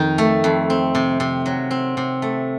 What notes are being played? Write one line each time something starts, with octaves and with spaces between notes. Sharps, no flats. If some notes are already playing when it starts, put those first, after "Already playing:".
Already playing: F2 D#3 D#4
A3
F2
C4
C3
C3
F#3
C4
C3
A3